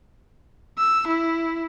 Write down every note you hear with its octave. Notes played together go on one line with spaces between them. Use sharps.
E6
E4